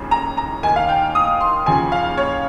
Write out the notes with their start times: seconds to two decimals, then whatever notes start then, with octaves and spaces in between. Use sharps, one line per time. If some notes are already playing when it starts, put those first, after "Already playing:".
Already playing: F1 D#2 C#3 F3
0.11 A#5
0.37 A#5
0.63 D#2 D#3 G#5
0.76 F5
0.89 G5
1.15 D#6
1.41 C6
1.66 D#2 C#3 F3 G#5
1.92 F5
2.17 C#5